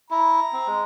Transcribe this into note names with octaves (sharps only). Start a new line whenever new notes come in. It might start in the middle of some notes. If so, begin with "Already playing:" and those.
E4 A#5
C4
G#3